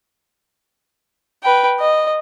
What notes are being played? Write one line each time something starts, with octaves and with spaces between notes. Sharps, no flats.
B4 G5
D#5